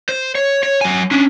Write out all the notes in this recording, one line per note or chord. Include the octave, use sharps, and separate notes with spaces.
C5
C#5
C#5
F#3 G#5
C#4 D4